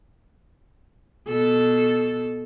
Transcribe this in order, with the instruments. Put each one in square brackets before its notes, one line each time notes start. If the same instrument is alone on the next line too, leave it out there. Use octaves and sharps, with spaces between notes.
[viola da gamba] B2 A4